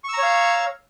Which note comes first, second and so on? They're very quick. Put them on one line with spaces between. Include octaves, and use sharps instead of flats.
C#6 E6 A#5 C#5 F5